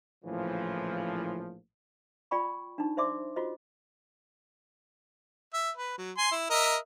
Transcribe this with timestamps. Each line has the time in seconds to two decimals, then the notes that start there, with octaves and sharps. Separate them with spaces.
0.25 A#1 A2 C#3 E3 F3
2.31 F4 D5 G5 B5 C#6
2.78 D4 D#4
2.97 C5 D5 E5 C6 D6
3.36 F4 F#4 C5 D#5
5.54 E5
5.77 B4
5.98 F#3
6.18 G#5 C6
6.32 E4
6.50 A#4 D#5 E5